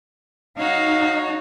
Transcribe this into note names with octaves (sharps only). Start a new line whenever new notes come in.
D#4 F#4 C#5 F5